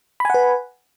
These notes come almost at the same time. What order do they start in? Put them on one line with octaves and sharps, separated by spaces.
B5 G#5 F#5 B4